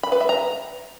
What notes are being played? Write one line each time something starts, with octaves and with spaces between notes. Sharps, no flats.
B5
B4
E5
A#5